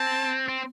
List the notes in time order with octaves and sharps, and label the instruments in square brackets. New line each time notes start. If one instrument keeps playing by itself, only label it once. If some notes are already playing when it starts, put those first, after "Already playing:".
Already playing: [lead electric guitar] C4 [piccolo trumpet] A5
[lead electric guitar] C4